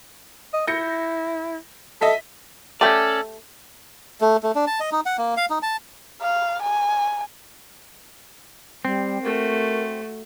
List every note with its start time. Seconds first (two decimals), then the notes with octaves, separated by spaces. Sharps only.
0.54 D#5
0.67 E4 G6 A#6 C#7
2.01 A4 D#5 E5 B6
2.81 A3 C#4 G4 A4 D5
4.21 A3
4.43 A3
4.55 D4
4.67 A5
4.80 D#5
4.92 D#4
5.06 F#5
5.18 A#3
5.37 F5
5.50 D#4
5.63 A5
6.21 F5
6.62 G#5
8.85 G3 C4
9.23 A3 F#4 A#4